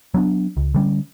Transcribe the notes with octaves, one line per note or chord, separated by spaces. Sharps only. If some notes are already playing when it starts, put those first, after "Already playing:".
F#3 B3 D4
C#2
D3 G3 C#4